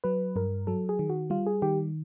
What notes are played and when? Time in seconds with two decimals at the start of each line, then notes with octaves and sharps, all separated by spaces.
0.04 F#3 B4
0.36 G2 A#4
0.67 F#3 A4
0.89 G#4
0.99 D#3
1.10 F#4
1.30 G3 F4
1.47 G#4
1.62 D#3 G4